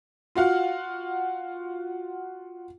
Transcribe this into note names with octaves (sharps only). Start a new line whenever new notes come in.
F4 F#4 F5 F#5